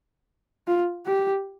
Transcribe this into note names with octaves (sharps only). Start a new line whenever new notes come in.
F4
G4